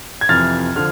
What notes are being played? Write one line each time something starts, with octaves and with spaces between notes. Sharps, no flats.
G#6
F2 C3 E3 F6 A6
D3 F3 F6